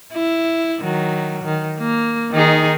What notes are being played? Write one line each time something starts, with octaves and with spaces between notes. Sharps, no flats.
E4
D#3 F#3
D#3
A#3
D#3 D#4 G#4